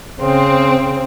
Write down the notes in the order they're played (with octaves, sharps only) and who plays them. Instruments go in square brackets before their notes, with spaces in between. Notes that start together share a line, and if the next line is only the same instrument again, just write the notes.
[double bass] C#3 [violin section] C4